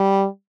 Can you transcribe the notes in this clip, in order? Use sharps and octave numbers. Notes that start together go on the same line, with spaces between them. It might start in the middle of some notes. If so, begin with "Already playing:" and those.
Already playing: G3